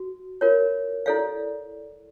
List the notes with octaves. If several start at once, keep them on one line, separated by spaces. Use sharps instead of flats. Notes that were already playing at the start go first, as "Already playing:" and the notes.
Already playing: F#4
F4 A#4 C#5
E4 A4 D5 F5